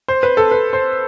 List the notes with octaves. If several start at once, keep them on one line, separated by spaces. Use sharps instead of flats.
C5
B4
A4
B4
C5